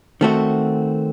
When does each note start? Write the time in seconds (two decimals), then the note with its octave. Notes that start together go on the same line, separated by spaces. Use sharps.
0.21 D#3 A3 C4 F#4